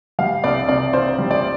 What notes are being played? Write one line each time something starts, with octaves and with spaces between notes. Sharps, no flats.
G3 F5
C2 D5
C3 D5
C4 C5
G3
D5